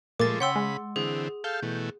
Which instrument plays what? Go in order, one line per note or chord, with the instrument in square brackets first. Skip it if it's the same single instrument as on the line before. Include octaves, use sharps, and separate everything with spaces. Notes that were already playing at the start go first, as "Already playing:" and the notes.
[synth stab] A#2 A#4 [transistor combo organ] F3 G#3 A3 [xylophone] D6 A6
[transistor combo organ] C#3 B5 [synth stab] C#5 G5 [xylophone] F#5 C6 E6
[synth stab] G#3
[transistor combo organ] D3 E3 C4 [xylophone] G#4
[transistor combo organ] A4 F5 [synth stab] G6
[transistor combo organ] B2 E3 A3